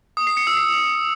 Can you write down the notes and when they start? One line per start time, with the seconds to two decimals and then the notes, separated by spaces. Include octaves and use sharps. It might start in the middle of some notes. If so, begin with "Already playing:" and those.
0.17 D#6
0.27 C7
0.37 C#7
0.47 E6
0.57 C7